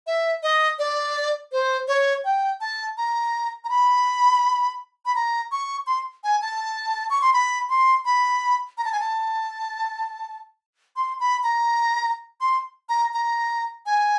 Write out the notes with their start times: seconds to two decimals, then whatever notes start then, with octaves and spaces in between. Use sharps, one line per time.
0.07 E5
0.43 D#5
0.79 D5
1.52 C5
1.88 C#5
2.25 G5
2.61 A5
2.97 A#5
3.64 A#5
3.70 B5
5.06 B5
5.15 A#5
5.52 C#6
5.87 C6
6.24 G#5
6.42 A5
7.10 C#6
7.22 C6
7.33 B5
7.69 C6
8.05 B5
8.78 A#5
8.85 A5
8.92 G#5
9.00 A5
10.96 C6
11.20 B5
11.43 A#5
12.41 C6
12.89 A#5
13.14 A#5
13.86 G#5